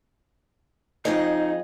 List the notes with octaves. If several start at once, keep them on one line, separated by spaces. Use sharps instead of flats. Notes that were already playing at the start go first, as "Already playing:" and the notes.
F2 D#4 G#4 D#5